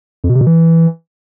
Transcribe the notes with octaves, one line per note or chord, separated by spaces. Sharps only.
F2
B2
C3
B2
E3